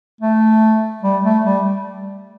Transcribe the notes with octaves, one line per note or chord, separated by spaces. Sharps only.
A3
G3
A3
G3